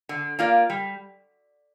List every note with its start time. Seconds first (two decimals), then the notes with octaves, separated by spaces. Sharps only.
0.09 D3
0.39 A#3 F4 D5
0.70 G3